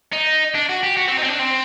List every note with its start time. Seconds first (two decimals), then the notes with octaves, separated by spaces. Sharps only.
0.13 D#4
0.55 D4
0.69 F#4
0.83 G4
0.97 F#4
1.08 C4
1.18 D#4
1.23 C4
1.29 D4
1.39 C4